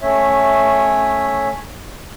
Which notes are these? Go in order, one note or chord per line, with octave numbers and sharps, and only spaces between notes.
A3 C#4 C#5 E5